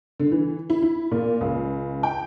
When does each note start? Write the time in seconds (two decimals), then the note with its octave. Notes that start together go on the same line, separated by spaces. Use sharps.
0.20 D3
0.32 E3
0.70 E4
0.83 E4
1.11 A#2
1.41 C#2
2.03 G5